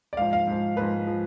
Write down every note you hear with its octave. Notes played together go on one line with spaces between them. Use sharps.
D5
G#2 F3 F5
F5
G#2 F3
G#2 F3 B4
F3